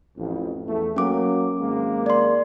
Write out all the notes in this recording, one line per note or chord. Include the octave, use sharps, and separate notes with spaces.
A1 F2
E2 A3
F#3 A#3 C#4 D6
G#1 G#3 A#3
D5 C6